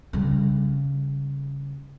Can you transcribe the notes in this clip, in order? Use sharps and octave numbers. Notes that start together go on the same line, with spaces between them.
C#3 G3